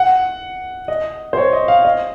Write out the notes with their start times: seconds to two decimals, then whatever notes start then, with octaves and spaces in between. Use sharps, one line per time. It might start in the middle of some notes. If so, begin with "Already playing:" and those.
Already playing: F#5
0.88 D#5
1.33 C5
1.37 C#5
1.53 D#5
1.68 F5
1.85 D#5